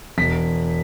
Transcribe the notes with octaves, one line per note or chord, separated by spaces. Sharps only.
E1 B6